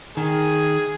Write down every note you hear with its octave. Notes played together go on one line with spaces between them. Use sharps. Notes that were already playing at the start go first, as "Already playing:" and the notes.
D#3 G#4